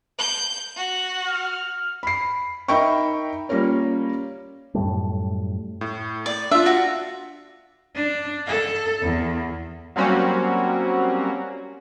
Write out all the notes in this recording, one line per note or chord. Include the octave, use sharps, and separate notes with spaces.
G6
F#4
F6
B5 C7
D#4 A#4 E5 G5 B5 C#6
G3 A#3 C#4 F4 A#4 C#5
F#2 A2 G3 A3
A2
D5
D4 F4 E5
F#4
D4
A4
E2
F#3 G3 A#3 C4 C#4 F#4